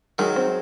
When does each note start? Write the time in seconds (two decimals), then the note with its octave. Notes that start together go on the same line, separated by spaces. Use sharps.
0.18 D#3 F#3 G#3
0.36 C4